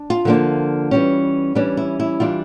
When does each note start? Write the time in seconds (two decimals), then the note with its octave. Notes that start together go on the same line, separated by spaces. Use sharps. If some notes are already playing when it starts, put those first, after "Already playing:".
Already playing: D4
0.10 F4
0.25 D3 F3 A#3 D4
0.91 E3 G3 C#4
1.55 E3 G3 C#4 D4
1.77 E4
2.00 E4
2.20 E3 G3 D4 F4